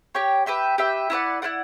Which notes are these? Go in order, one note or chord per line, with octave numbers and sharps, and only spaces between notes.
G4 C#5 G5
G4 B4 E5 G5
G4 B4 E5 G5
E4 B4 D5 F#5
E4 B4 D5 F#5